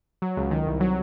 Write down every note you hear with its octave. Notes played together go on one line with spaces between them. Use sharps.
F#3
C#2
D#3
C2
F#3